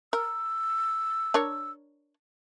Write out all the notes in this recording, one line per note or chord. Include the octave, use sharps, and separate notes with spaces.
A#4 E6
D4 A#4 C#5